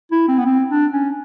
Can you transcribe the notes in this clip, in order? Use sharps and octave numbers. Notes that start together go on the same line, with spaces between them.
E4
C4
B3
C4
D4
C#4